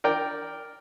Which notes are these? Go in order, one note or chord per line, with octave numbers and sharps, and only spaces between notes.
A#4 D5 G5